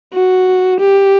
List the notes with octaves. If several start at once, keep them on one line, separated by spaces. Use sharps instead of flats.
F#4
G4